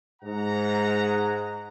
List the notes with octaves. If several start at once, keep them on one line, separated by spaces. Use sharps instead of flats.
G#2 F#5 A#5